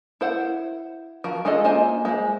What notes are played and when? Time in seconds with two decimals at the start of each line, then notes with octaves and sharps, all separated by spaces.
0.21 E4 C5 F#5
1.24 F3 F#4 A#4
1.45 G#3 F4 G#4 A4 D#5
1.64 A#3 F4 C5 D#5 G#5
2.05 G#3 C5